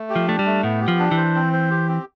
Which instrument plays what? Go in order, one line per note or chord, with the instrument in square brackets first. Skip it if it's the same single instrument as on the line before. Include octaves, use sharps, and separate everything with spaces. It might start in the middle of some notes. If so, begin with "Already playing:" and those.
Already playing: [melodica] A3
G4
[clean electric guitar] F3
[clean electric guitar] A3 [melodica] D4
[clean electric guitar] G3
[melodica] A3
[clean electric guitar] A2 [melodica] B3
[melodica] G4
[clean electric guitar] F3
[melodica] D4
[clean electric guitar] E3
[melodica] C5
C4
C5
G4
C4